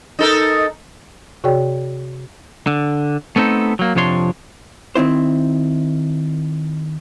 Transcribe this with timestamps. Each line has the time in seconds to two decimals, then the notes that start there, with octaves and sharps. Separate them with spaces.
0.19 D#4 A4 A#4
1.44 C3 F#4 G#4 C#5 D5 G5
2.67 D3
3.36 A3 B3 C4 D#4 A4
3.79 F#3 A#3
3.95 F2 C3 F3 D4 C#5 C6
4.96 D#3 C4 E4 C5